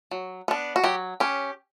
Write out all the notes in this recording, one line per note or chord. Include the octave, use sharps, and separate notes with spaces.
F#3
B3 D4
F#4
F#3 G4
C#4 G4